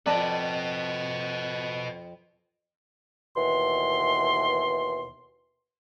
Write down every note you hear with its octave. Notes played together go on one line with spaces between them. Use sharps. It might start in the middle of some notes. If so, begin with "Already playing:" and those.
F2 B4 D5 D#5 A5
D#2 B2 E3 C6